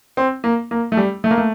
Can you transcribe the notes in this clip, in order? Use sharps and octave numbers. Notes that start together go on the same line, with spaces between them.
C4
A#3
A#3
A3
G3
A3
A#3
A3